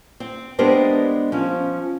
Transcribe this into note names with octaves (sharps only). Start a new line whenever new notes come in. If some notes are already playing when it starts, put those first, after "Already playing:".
C4
G#3 B3 D4 G4 A#4 C5
F3 C#4